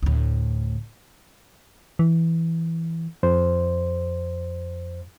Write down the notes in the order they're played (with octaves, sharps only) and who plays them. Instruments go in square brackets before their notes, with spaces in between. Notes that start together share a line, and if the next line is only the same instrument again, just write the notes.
[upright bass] D2 A2
[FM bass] E3
[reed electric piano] F2 C5